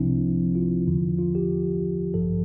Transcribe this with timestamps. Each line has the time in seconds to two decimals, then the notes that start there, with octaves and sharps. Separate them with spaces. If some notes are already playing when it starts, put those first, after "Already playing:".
Already playing: C2 C3 F3 C4 D4 E4
0.55 F4
0.87 E2 D3 F3
1.19 F4
1.35 G4
2.14 A1 G2 F3 A4